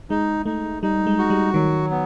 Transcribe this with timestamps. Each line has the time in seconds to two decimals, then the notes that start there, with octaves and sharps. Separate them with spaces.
0.10 G#3 D#4
0.46 A3 D#4
0.83 G3 D#4
1.07 G#3
1.18 F#4
1.30 G3
1.54 D#3 F#3
1.91 B3